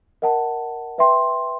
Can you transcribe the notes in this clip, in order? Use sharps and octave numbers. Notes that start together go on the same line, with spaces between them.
A#4 D#5 F#5 A5
B4 E5 G5 C6